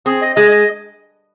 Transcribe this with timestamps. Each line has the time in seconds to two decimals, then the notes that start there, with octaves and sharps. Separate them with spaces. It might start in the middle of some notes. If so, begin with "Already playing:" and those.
0.06 C4 G#4
0.22 D#5
0.36 G#3 D#5
0.51 D#5